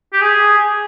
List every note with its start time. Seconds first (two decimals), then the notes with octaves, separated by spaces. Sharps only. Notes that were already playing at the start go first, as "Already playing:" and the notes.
0.13 G4
0.21 G#4